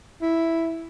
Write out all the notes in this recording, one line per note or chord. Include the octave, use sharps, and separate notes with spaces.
E4